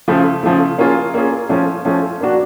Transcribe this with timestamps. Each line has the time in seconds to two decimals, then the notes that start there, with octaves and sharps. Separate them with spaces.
0.08 C#3 F3 A3
0.43 C#3 F3 A3
0.78 A#3 C#4 F4 G#4
1.14 A#3 C#4 F4 G#4
1.49 F3 A3 C#4
1.85 F3 A3 C#4
2.20 A#3 D4 F#4